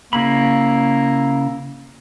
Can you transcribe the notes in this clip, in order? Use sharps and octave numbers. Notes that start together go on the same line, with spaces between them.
C#3 A#3 E4 B5